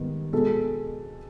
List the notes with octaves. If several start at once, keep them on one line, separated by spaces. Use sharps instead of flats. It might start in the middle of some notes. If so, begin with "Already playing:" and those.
Already playing: G#2 D#3 G3 B3
B2 G#3 B3 A4